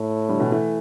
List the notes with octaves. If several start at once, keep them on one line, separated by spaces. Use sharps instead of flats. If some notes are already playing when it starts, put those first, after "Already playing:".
Already playing: A2
D3 G3
B2 E3
E3 A3